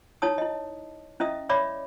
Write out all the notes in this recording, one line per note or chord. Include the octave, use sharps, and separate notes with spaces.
D#4 E4 C#5 A5 D#6
E4 D#5
C#4 E4 D#5 E5 D#6
C#5 D5 E5 B5 D6